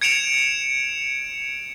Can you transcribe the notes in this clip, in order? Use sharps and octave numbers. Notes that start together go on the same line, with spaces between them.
G#6 C#7 D7 E7 F7